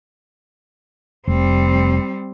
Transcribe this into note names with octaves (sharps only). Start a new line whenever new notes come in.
F1 G3 C4